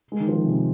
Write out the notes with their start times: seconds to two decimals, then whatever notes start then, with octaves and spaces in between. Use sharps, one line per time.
0.12 G#3
0.20 D#3
0.28 F3
0.36 D#3
0.45 C3